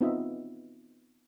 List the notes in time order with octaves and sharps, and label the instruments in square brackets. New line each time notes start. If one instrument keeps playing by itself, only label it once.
[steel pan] B3 C4 D#4 F4 D#5 E5